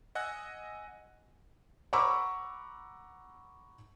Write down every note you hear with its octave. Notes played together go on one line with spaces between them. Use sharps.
D#5 F#5 G#5 E6 F#6 A#6
F#5 A#5 B5 C#6 D6 E6